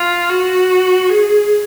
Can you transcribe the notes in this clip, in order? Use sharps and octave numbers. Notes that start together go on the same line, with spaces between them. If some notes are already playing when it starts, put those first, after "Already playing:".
Already playing: F4
F#4
G#4